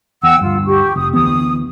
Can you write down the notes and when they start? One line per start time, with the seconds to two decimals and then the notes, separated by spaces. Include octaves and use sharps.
0.23 E2 F#5 G5 E6
0.41 D2 G2 F4
0.66 G4 C#6
0.96 F1 D#6
1.14 D2 E3 B3 D#6